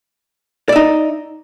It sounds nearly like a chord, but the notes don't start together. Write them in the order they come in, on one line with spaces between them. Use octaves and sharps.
D5 E5 D#4